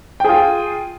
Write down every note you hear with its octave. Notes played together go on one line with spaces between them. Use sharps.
F4 G#4 G5